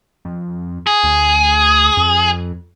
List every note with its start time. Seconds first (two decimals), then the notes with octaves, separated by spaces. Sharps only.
0.25 F2
0.87 G#4
1.03 D2
1.97 F2